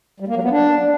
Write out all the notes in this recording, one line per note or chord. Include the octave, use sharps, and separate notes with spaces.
G3
A#3
F#3
B3
D4